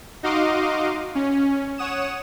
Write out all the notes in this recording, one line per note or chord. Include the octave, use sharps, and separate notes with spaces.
D#4 F#4 D#5 F5 C6 D6
C#4
C#5 F#5 D#6 E7